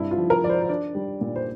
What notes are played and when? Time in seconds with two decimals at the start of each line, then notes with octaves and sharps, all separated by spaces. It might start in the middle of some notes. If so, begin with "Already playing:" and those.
Already playing: G2 C3 E4
0.11 F4
0.18 F3
0.30 A#4
0.43 F3 D5
0.49 C5
0.62 C5
0.69 D4 D5
0.95 G3
1.21 A#2
1.36 C5